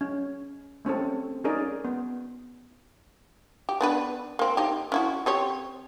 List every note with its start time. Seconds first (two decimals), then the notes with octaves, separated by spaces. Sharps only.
0.01 C#4
0.85 A3 C4 C#4 A4
1.44 C#4 D#4 G#4 A#4 D5
1.85 B3
3.69 G4
3.81 B3 D4 B4
4.39 A#3 C4
4.57 D#4 G4
4.92 C#4 E4 F#4
5.26 C4 G4 C#5